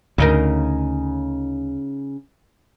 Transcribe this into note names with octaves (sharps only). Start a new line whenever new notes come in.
D2 C#3 D#4 A#4